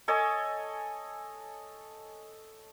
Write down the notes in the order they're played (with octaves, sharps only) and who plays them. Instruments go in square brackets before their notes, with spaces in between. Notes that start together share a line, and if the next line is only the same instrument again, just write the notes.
[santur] A4 C#5 D#5 G#5